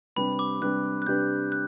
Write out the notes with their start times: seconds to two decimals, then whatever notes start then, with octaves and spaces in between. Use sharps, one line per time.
0.16 C3 G3 D4 G4 B4 B5
0.39 D6
0.62 C3 G3 D4 G4 B4 F#6
1.02 F#6
1.07 C3 G3 D4 G4 B4 G6
1.52 F#6